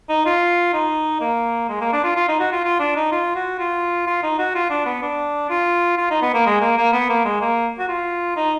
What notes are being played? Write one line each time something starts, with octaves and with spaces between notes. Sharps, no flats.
D#4
F4
D#4
A#3
G#3
A#3
D4
F4
F4
D#4
F#4
F4
F4
D4
D#4
F4
F#4
F4
F4
D#4
F#4
F4
D4
B3
D4
F4
F4
D#4
B3
A#3
G#3
A#3
A#3
B3
A#3
G#3
A#3
F#4
F4
D#4